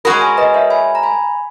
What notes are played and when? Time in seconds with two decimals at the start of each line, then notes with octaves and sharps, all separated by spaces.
0.05 G#3 C#4 F#4 A#4 B5 D#6
0.21 G#5 B5
0.37 B4 D#5
0.54 C#5 E5
0.70 G#5 B5
0.95 A#5
1.03 G#5 B5